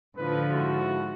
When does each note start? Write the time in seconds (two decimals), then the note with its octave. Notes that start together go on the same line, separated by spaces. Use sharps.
0.16 A2 D3 F3 B4
0.50 G#2 E4 F#4